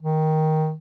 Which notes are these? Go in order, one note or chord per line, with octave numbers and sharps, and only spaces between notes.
D#3